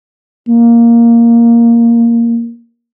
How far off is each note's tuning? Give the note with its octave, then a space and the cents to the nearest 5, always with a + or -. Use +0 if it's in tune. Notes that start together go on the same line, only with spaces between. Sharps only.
A#3 +0